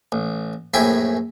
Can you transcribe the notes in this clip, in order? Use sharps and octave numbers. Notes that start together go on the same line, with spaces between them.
A1
A#1 F#2 A2 E4 G5 G#5